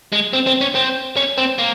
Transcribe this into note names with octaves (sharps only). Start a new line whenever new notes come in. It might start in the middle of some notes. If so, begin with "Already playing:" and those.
G#3
C4
C4
C#4
C4
C#4
C4
A#3